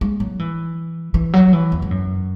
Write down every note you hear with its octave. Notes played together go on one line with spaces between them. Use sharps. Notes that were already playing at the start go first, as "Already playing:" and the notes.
G#3
F#3
E3
E3
F#3
E3
E2
G#2
F#2